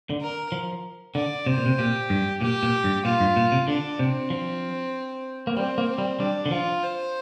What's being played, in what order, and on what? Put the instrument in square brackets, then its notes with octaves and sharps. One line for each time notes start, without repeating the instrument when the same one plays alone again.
[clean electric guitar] D3
[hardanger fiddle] A#4
[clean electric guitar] F3
[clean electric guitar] D3 [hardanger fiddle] D5
[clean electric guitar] C3 [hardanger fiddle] C5
[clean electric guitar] A#2
C3
[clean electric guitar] A#2 [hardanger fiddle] G4
[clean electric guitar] G2
[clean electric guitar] A#2 [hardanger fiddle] G4
[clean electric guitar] A#2
G2
[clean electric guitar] A#2 [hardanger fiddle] F4
[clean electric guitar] G2
A#2
C3
[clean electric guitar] D3 [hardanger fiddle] D4
[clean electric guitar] C3 [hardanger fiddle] C4
[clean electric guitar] F3
A#3
[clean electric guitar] G3 [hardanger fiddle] C4
[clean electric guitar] A#3
[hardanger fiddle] C4
[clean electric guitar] G3
[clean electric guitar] G3 [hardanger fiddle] D4
[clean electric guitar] D3
[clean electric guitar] F3 [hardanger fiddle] F4
[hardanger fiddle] C5